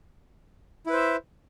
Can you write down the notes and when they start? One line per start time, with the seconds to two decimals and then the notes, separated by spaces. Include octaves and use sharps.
0.86 E4
0.90 B4
0.93 C5
0.96 E5